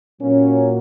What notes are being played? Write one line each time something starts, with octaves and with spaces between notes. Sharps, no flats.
A#2 F#3 A#3 C#4